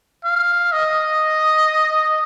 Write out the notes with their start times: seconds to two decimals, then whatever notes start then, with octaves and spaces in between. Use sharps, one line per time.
0.24 F5
0.72 D#5